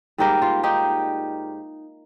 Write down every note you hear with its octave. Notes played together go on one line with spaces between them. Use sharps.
G#2 G3 A#3 G4 A#4
F4
D#4 G4